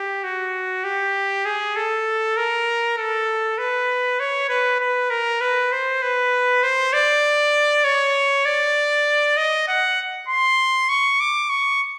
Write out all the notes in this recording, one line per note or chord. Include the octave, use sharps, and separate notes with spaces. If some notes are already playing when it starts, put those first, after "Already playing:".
Already playing: G4
F#4
G4
G#4
A4
A#4
A4
B4
C#5
B4
B4
A#4
B4
C5
B4
C5
D5
C#5
D5
D#5
F#5
C6
C#6
D6
C#6